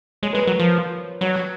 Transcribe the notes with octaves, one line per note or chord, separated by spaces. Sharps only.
G#3 C#5
G#3 B4
F#3 A#4
B4
F3
F#3 C#5